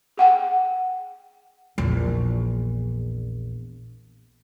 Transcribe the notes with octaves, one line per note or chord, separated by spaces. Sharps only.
G#4 F#5 G5
A#1 E2